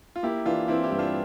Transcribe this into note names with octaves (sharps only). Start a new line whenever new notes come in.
F4
A#3 E4 G4
E3 D4 F4
E3 C4 E4
E4 G4
G2
D4 F4